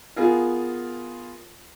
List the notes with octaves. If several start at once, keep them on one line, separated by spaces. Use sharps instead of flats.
B3 F4 G#4 A#4